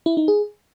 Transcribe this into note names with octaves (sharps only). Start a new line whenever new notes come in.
E4
D#4
G#4